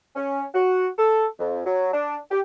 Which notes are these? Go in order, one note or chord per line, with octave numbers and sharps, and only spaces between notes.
C#4
F#4
A4
F2
F#3
D4
G4